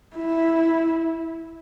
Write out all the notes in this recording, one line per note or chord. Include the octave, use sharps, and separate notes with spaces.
E4